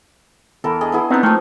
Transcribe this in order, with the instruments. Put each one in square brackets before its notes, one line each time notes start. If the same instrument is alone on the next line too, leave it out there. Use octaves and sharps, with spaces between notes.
[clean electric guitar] E2 E3 [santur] A4 A#4
[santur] D4 G#4 D#5
B3 E4 G#4
[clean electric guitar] B3 C4 D4 [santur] D#4 A#5
[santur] F3 C4 [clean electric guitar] A3 A#3